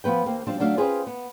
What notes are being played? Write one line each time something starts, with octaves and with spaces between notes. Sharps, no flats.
F3 B3 B4 G5
D#2 A#3 C4
F3 G3 C4 D4
F#3 A3 D4 D5 F5
C4 C#4 F4 G#4 B4 C5
B3